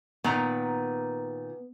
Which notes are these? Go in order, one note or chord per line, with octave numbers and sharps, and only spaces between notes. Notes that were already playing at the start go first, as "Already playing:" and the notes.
A#2 D#3 B3 A#5